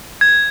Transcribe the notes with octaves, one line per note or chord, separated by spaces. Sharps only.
G#6